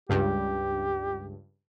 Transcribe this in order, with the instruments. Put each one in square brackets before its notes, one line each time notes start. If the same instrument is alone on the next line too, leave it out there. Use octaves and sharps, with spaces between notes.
[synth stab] C#2 G2 [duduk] G4